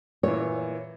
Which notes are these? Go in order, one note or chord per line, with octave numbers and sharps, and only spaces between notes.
A#2 E3 C#5